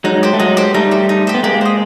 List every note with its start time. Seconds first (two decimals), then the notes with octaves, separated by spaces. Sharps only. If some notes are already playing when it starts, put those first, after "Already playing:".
0.04 F#3 G#3 D#4
0.23 G4 C5
0.33 A3
0.40 F#3 G#3 D#4
0.57 G4 C5
0.74 G3 A3 D#4
0.91 G4 C5
1.09 D#4
1.27 G4 C5
1.34 B3
1.43 G#3 A#3 G4
1.61 C5 D#5